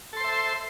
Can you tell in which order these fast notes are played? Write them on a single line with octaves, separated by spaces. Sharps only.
A4 C6 C5 E5